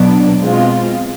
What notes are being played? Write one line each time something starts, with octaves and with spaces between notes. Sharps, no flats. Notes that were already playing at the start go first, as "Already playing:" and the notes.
Already playing: B2 F#3 B3 D4
B2 G#3 C4 F4